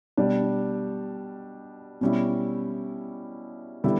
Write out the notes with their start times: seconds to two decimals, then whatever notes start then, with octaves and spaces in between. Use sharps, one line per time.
0.17 B2 G3 D4
2.01 B2 G3 C#4 E4
3.84 D3 G3 B3 E4